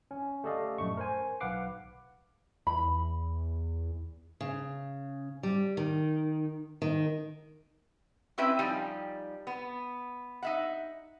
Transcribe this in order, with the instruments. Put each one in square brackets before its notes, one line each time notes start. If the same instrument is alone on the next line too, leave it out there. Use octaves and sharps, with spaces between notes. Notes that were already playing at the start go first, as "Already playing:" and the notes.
[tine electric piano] C#4
A3 G4 A4 D5 D#5 F5
A#1 F#2 A3 C#6
A#4 C5 G#5
B1 B4 F5 F#5 D6 C7
[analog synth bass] E2 [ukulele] B5
[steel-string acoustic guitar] C#3
G3
D#3
D#3
[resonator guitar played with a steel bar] C4 C#4 E4 B4 E5 G5
F3 G3 D#4 G5 G#5
B3
D#4 E5 F#5